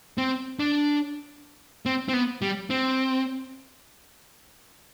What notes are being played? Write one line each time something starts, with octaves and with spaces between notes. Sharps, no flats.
C4
D4
C4
C4
B3
G3
C4